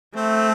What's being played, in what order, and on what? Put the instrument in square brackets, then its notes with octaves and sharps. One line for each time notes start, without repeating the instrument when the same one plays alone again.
[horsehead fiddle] A3 [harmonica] C4